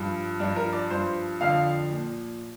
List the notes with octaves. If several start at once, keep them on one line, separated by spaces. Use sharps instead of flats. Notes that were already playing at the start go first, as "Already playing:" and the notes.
Already playing: G2 F3
G2 F3 D4
A#4
D5
G2 F3 C5
F2 D3 F3 F5
A#2 F3